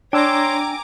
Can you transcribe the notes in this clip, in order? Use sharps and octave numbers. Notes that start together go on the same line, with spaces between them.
D4 C#5 G5 G#5 A#5 C6 D6 E6